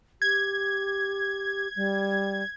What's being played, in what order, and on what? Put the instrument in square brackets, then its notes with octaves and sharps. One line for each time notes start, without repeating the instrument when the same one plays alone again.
[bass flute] G4 [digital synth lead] G#6
[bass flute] G3